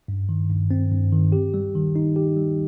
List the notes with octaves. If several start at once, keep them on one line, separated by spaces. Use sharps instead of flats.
G2
D#3
G2
C4
G2
D#3
G4
G3
D#3
D#4
G4
G3